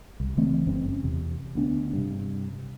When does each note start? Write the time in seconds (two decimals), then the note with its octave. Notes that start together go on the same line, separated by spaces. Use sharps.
0.20 C2
0.37 C#3 E3 A3 C4
0.67 F#1 G2 C4 C#4
1.03 E2 C3
1.55 D2 B3 D4
1.93 G2 C3